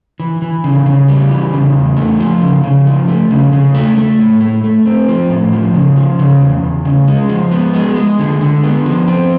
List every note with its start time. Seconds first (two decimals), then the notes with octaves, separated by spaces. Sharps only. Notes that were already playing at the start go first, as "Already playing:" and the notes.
0.20 E3
0.42 E3
0.64 C#3
0.86 C#3
1.08 G3
1.30 E3
1.53 C#3
1.75 E2
1.97 A3
2.19 F3
2.41 C#3
2.64 C#3
2.86 F3
3.08 A3
3.31 C#3
3.53 C#3
3.74 A3
3.97 A3
4.19 A2
4.41 A3
4.64 A3
4.86 C4
5.08 F3
5.29 A2
5.52 F3
5.74 C#3
5.96 F3
6.19 C#3
6.41 E2
6.63 E2
6.85 C#3
7.07 G#3
7.29 F3
7.51 B3
7.74 G#3
7.96 G#3
8.19 D3
8.41 D3
8.63 B3
8.85 F3
9.08 C4